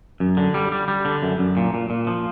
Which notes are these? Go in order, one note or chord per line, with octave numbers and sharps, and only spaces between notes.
F#2
D3
G3
G3
G3
D3
F#2
F#2
A#2
A#2
A#2
F3